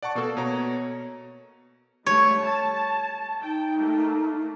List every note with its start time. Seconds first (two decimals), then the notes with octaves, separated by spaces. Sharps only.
0.03 D5 F#5 A5 C#6
0.15 B2 A#3 F#4 A4
0.37 B2 C#5 A#5
2.06 G3 A3 C#5
2.43 A5
3.43 D#4 G5
3.79 A3 A#3